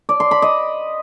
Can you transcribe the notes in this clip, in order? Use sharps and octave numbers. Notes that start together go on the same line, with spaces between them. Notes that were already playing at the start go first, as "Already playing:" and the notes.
D5
C6
B5
D#5